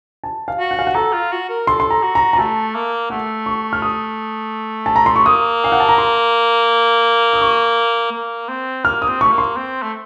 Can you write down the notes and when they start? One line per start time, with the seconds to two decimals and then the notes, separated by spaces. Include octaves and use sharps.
0.24 A5
0.48 F5
0.59 F#4
0.71 F#5
0.79 F5
0.87 F#5
0.95 A4 A#5
1.13 F4
1.32 F#4
1.50 A#4
1.67 A4 C6
1.80 C6
1.91 A#5
2.03 F#4
2.15 A#5
2.33 A#5
2.38 A3 A5
2.75 A#3
3.10 A3 F#5
3.46 C#6
3.73 F6
3.82 D#6
4.86 A5
4.96 A#5
5.06 C6
5.16 C#6
5.26 A#3 D#6
5.64 F5
5.72 F#5
5.80 A5
5.89 A#5
5.98 C6
7.33 D#6
7.41 C#6
8.12 A#3
8.49 C4
8.85 A#3 F6
9.02 D#6
9.08 C4
9.21 A3 C#6
9.32 A#3
9.38 C6
9.56 C4
9.82 A3